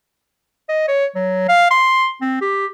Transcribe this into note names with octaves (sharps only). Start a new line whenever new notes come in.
D#5
C#5
F#3
F5
C6
C4
G4